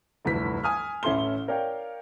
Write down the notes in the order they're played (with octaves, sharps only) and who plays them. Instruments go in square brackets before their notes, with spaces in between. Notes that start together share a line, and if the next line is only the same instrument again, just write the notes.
[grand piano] F1 D2 G2 E3 B6
G#5 D#6 F6
A1 C#4 E4 A4 C6 G7
A#4 C#5 D5 F5 G5